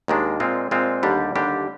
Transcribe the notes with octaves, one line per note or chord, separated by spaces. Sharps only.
D#2 D#3 G#3 D4
A#2 G#3 C4 F4
A#2 G#3 C4 F4
D#2 D3 G3 D4 G4
D#2 D3 G3 D4 G4